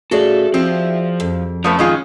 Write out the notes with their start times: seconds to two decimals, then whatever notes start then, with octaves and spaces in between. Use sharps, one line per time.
0.11 A#2 A3 C#4 F#4 G#4 A4 D5
0.54 F3 C4 E4 G4
1.20 F2
1.64 F3 A3 C#4 B4
1.79 D#3 G#3 F4